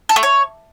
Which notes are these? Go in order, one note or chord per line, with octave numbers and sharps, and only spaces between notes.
A4
A3
C#5